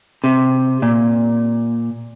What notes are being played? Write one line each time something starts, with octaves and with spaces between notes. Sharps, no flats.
C3
A#2